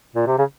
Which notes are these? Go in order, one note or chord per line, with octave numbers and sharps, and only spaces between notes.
A#2
C3
C#3